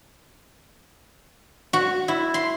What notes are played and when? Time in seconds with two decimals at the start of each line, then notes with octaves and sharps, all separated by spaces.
1.73 F#4
2.08 E4
2.34 C6